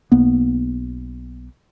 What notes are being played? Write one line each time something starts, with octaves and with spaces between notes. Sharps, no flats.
B1 A#3 B3